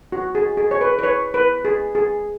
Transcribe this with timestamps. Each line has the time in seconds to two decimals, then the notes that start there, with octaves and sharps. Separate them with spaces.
0.12 F#4
0.35 G#4
0.57 G#4
0.71 C#5
0.81 B4
0.99 B4
1.03 C#5
1.34 B4
1.65 G#4
1.95 G#4